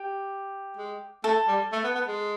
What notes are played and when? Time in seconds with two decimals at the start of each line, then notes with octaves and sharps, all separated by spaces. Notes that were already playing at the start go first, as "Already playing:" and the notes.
Already playing: G4
0.77 G#3
1.24 A3 A4
1.48 G3
1.72 A3
1.84 B3
1.95 B3
2.08 G#3